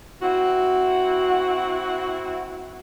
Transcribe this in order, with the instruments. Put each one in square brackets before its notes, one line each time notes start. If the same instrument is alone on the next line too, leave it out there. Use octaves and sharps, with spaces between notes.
[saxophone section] C4 E4 F#4